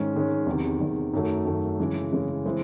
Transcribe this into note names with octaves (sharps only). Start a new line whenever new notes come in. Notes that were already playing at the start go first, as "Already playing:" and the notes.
Already playing: G#2 D#3 G#3 C#4
G#2 D#3 G#3 C#4
E2 C3 D#3
E2 C3 D#3
F#2 D#3 F#3 A3
F#2 D#3 F#3 A3
C#3 E3 G#3
C#3 E3 G#3
E3 G#3 C4 E4